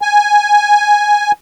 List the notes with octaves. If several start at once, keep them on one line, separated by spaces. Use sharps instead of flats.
G#5